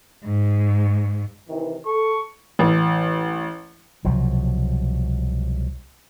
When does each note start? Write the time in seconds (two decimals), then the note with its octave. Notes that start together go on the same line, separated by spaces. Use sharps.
0.25 G#2
1.49 C3 D#3 E3
1.86 A4 C#6
2.59 A1
4.05 C2 B2 F3 F#3